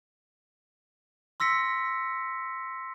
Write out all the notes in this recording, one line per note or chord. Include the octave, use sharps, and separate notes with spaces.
C6 E6 A#6 B6 C#7